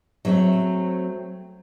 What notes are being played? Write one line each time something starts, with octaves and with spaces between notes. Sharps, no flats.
F#3 A3 C4